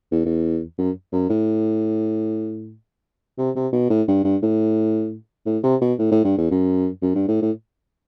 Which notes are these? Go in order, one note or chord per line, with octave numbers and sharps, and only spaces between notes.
E2
E2
F#2
F#2
A2
C3
C3
B2
A2
G2
G2
A2
A2
C3
B2
A2
A2
G2
E2
F#2
F#2
G2
A2
A2